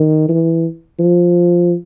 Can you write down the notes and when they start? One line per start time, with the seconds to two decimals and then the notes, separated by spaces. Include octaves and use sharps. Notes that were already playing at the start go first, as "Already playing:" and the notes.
Already playing: D#3
0.29 E3
0.99 F3